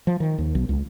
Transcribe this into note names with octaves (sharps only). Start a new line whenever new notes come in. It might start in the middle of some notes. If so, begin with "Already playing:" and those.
F3
D#3
D#2
B1
C#2